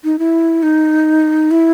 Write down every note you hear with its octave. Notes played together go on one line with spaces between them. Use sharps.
D#4
E4
D#4
E4